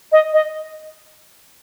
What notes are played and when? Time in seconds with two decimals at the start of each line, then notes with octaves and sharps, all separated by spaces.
0.12 D#5
0.33 D#5